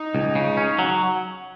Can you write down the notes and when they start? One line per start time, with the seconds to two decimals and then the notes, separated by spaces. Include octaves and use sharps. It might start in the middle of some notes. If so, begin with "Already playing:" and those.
Already playing: D#4
0.15 C#2
0.35 C#3
0.57 C#4
0.79 F#3